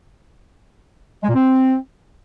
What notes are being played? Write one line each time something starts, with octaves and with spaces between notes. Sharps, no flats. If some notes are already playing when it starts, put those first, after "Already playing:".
G#3
A#2
C4